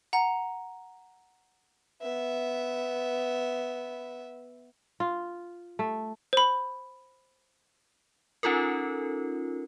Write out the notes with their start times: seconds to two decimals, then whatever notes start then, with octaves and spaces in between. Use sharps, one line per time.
0.13 F#5 A#5 F7
2.02 B3 E5
5.00 F4
5.79 A3
6.33 C5 B5
8.43 C#4 D#4 F4 A4 A#4